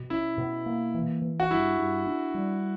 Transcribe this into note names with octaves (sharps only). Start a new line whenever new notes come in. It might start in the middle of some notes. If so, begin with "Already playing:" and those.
Already playing: B2
C#4 E4
B2
A#3
E3
E3
F#4
G2 E4
G2
D4
G3